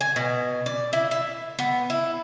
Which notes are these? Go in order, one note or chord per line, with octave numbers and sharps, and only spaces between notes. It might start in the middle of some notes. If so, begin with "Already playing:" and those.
G#5
B2
D5
E4
E5
B3
E4